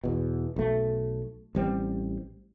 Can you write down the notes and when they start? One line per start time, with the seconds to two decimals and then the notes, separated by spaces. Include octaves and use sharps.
0.04 E2 B2
0.56 B1 A3
1.55 A1 G3 C4